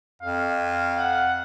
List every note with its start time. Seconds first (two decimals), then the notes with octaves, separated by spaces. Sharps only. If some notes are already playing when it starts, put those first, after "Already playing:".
0.22 F2 F5
0.97 F#5